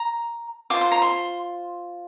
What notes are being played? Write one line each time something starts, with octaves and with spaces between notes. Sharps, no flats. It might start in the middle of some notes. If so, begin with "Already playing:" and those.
Already playing: A#5
F4 C5 D6
C6
A#5
C6